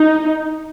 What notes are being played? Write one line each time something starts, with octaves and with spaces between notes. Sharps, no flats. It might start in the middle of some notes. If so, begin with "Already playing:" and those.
Already playing: D#4